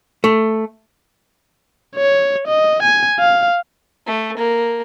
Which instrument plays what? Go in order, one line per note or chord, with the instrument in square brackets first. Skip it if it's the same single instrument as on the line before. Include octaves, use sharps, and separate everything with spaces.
[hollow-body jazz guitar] A3
[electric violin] C#5
D#5
G#5
F5
[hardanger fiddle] A3
A#3